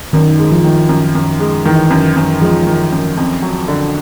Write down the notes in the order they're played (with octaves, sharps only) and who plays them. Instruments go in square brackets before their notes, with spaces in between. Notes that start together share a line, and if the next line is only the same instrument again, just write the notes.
[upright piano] F#2 [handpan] D#3
[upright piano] G#3
[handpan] F3
[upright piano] D#3
F#2
F#2
G#3
[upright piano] D#3 [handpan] E3
[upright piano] F#2
F#2
[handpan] F3 [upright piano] G#3
[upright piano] D#3
F#2
F2
F#3
D3